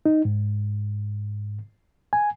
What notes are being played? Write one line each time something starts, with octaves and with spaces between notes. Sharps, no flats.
D#4
G#2
G#5